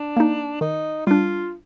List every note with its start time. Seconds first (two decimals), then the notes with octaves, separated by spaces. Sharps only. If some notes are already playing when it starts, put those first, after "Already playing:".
Already playing: D4
0.17 A#3 D#4
0.61 D#3 D#4
1.06 G3 D4 F4